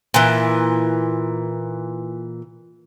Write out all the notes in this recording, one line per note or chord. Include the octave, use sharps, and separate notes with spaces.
A#2 E3